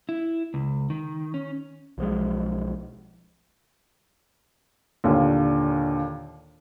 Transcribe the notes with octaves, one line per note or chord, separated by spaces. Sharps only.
E4
C#2
D#3
C#4
B1 F3 G#3
D#2 A#2 D3